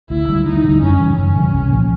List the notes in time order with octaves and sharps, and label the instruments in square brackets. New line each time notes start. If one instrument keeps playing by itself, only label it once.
[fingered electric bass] D2 [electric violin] E4
[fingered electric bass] D3 G3
[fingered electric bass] D2 [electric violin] D#4
[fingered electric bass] D3 G3
[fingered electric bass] F#2 [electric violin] C#4
[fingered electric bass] C#3 E3 G3
[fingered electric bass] F#2 [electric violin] C#4
[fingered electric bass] C#3 E3 G3
C2
A#2 F3